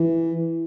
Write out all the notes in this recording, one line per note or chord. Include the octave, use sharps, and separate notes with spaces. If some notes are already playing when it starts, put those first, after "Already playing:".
Already playing: E3